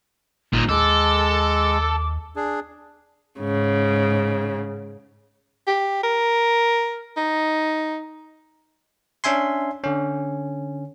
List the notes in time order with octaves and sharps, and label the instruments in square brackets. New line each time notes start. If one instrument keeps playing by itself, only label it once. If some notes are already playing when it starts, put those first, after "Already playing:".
[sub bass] G#1 [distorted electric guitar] A#2 D#4
[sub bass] D#2 [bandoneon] G#3 [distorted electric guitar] A4 [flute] D6
[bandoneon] D4 G#4
[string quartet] G#2 C#3
[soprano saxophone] G4
A#4
D#4
[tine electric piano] C#4 D4 E5 G#5 C6
D3 C#4